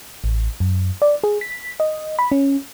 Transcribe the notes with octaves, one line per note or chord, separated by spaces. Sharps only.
A1
F#2
D5
G#4
B6
D#5
B5
C#4